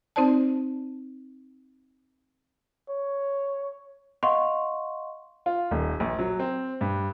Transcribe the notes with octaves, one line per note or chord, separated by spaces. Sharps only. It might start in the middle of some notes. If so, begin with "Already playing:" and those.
C4 D#4 C5 D5 A5
C#5
D#5 F5 F#5 C6 C#6
F4
D#1
A#1
F#3
C4
G2